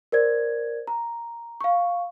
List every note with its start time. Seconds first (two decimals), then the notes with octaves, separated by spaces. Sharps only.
0.12 A#4 C5 D5 G#6
0.87 A#5
1.61 F5 C#6